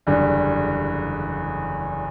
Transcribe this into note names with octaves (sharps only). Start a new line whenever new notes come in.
F#1 E2 D3 G3